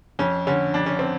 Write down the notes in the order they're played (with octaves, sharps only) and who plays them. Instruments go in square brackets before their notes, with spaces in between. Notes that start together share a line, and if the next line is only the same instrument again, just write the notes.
[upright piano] F2 C#4
D3 C#4
F2 D4
C#4
C4